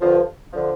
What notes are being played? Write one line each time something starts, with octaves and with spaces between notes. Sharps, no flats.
G2 D3 F3
D3 F3